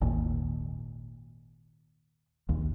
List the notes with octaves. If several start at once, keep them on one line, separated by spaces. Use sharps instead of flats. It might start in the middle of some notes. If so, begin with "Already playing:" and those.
G#1 D#2 A#2
A#1 D#2